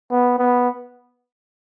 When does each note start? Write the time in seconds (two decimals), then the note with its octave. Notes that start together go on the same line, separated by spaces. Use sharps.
0.11 B3
0.39 B3